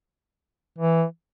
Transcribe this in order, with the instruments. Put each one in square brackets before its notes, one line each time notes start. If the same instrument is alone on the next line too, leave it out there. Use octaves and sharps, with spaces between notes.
[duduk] E3